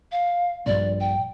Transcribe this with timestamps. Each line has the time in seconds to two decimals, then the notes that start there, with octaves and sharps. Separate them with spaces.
0.12 F5
0.66 A#1 G2 D5
1.00 G5